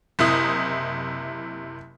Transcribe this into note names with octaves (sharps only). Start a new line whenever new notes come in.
F#1 C3 E4 D#6